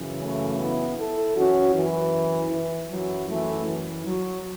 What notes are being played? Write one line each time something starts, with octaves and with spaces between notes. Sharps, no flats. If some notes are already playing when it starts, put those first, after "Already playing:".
Already playing: F#2 C#3 E3
A3 C#4
B3 E4
E4 A4
F#2 E3 C#4 F#4
E3
E3
F#2 E3 F#3
E3 A3
E3
F#3